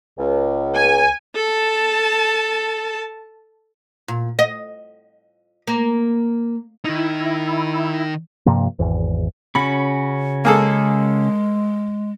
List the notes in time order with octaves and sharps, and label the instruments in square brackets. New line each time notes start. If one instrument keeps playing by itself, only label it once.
[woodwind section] C#2
[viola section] G#5
[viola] A4 A5
[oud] A#2
D#5
A#3
[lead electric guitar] D#3 D#4 [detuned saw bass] E4
[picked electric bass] G2 C3 F3 A#3
G#1 E2
[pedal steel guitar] C#3 C#4 F#4 [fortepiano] B5
[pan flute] G#3 [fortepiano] A#3 G#4 A4